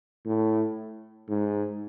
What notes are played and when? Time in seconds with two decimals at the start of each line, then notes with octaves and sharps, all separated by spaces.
0.26 A2
1.29 G#2